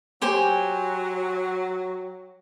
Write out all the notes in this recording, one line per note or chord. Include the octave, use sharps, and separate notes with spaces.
F#3 G4 C5 G#5